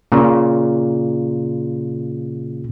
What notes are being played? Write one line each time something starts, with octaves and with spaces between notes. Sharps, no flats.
A#2 C#3